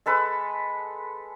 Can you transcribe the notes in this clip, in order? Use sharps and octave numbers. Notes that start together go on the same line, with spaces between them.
G#3 A4 B4